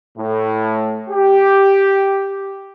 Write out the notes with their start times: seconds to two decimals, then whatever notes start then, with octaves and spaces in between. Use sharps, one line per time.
0.18 A2
1.10 G4